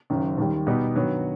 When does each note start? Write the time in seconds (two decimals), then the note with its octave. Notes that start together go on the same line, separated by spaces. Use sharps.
0.10 F#1 F#2 D#3
0.38 D#2 D#3 G3
0.66 B2 G3 B3 D#4 G4
0.96 G2 D#3 F#3 B3 F#4